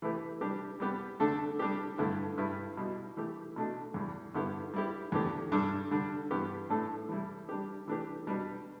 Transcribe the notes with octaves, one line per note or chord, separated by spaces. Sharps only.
E3 A3 E4 G4 B4
G3 D4 G4
G3 B3 G4 B4
D3 A3 D4 A4
G3 D4 G4
G2 D3 A3 E4 B4
G2 G3 E4 B4
B2 G3 E4
E3 A3 G4
B2 A3 D4
E2 E3 G3
G2 D3 B3 E4 G4
G3 E4 G4
E2 D3 A3 G4
G2 G3 D4 A4
D3 G3 D4
G2 E3 B3 G4
A2 A3 D4 A4
E3 G3 E4
G3 D4 G4
E3 A3 D4 G4 B4
B2 G3 D4 B4